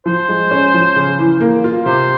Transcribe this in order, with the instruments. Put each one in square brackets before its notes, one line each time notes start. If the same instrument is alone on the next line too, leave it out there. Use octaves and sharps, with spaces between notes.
[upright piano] F3 [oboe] C5
[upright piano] G#3
C#4
F3
C#3
E3
A#3
F4
[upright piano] C3 [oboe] C5